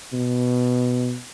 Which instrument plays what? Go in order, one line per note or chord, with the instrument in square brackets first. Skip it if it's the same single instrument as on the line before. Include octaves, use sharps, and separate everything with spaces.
[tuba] B2